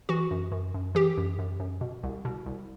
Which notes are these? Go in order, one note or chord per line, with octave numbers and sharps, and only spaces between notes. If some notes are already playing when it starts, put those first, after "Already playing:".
E3 F#4
F#2
F#2
F#2
E3 G4
F#2
F#2
F#2
B2
C2
B2
C2